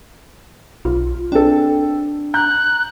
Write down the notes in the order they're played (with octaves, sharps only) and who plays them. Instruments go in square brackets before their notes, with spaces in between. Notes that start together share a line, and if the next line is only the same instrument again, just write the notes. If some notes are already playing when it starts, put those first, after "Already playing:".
[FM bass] B1 [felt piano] F4
[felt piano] C4 A4 [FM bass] D4
[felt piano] A#5 G6 [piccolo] F#6